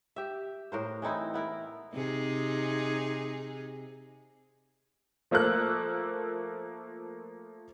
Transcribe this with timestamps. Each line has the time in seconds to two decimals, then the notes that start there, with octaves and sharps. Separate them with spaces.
0.16 G4 E5
0.72 A2 A#4 C5
1.02 E3 C4 D#4 E4
1.34 B3 E4 A#4
1.94 C3 D#4 G#4
5.31 F3 A3 A#3 A4 F#6